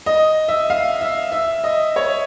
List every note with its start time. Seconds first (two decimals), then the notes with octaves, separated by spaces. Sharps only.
0.06 D#5
0.48 E5
0.70 F5
1.01 E5
1.32 E5
1.64 D#5
1.96 C#5